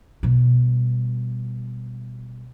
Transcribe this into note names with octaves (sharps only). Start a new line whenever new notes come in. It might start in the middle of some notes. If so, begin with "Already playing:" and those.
B2 G3